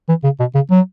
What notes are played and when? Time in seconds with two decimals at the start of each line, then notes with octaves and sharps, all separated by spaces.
0.09 E3
0.24 C#3
0.40 B2
0.55 C#3
0.71 F#3